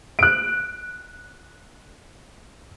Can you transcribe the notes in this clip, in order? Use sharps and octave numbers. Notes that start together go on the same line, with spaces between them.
F#6 D7